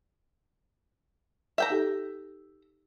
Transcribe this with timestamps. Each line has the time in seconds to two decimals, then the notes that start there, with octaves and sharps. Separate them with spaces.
1.58 E5 G5 A#5
1.70 D#4 G4 A4